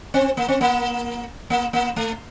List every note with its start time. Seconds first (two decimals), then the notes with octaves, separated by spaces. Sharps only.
0.14 C4
0.37 A#3
0.48 C4
0.61 A#3
1.50 A#3
1.73 A#3
1.96 A3